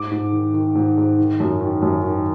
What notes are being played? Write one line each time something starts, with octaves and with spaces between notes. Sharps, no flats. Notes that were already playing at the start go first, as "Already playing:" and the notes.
Already playing: G#2 D6
G#2
D#3
D#3
G#2
G#2
D#3
F#2
D#3
F#2
D#3